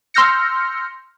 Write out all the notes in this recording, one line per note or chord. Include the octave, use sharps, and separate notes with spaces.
C6 E6 F6 G6 A#6 C#7